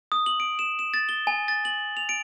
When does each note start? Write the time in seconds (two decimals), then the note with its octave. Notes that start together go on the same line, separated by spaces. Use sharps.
0.12 D#6
0.26 F#7
0.40 D7
0.59 E7
0.79 E7
0.94 A6
1.09 G7
1.27 G#5
1.48 A6
1.65 F#7
1.97 F7
2.09 D7